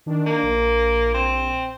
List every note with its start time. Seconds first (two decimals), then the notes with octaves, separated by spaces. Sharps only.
0.06 D#3 D4
0.27 A#3
0.43 A#1
1.14 C4